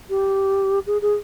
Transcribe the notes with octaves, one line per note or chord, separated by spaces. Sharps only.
G4
G#4
G#4